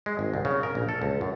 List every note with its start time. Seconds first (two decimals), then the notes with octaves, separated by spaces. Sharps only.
0.06 G#3
0.19 G#1
0.34 C2
0.45 C#3
0.63 A#4
0.75 A#1
0.89 A4
1.02 C#2
1.21 F#2